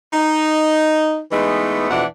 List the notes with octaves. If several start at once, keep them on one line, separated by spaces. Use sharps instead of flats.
D#4
E3 G#3 A3 B3 D#4
F2 B2 E3 D4 F#5